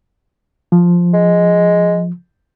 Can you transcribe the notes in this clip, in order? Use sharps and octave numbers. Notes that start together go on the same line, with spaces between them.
F3
G#3